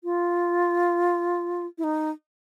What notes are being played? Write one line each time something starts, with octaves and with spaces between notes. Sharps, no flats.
F4
E4
D#4